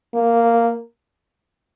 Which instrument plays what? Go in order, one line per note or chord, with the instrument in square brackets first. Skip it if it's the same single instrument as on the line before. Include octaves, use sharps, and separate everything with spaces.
[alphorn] A#3